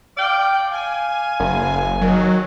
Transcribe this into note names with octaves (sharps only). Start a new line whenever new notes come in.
D5 F5 G5
F5 G#5
F#1
D#3 F#3